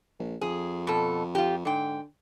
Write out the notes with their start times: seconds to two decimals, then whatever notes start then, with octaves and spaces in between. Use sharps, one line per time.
0.19 A#1
0.41 F2 G#4
0.87 B2 A4
1.35 F4 G4
1.65 G#2 D3 G5